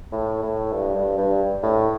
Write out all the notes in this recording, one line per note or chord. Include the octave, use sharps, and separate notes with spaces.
A2
A2
G2
G2
G2
A2